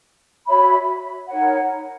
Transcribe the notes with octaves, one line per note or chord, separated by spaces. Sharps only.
F#4 C#5 E5 B5
D#4 A#4 C#5 F#5